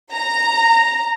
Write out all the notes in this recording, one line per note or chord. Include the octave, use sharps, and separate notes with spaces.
A#5